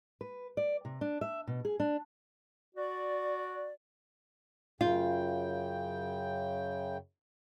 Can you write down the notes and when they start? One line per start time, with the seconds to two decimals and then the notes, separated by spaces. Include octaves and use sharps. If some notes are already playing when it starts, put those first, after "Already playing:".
0.21 B4
0.57 D5
0.85 C3
1.01 D4
1.21 E5
1.47 B2
1.65 G#4
1.80 D4
2.75 F#4 D5
4.81 F#2 C#3 F4 G5